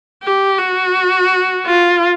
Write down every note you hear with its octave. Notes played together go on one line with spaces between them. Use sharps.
G4
F#4
F4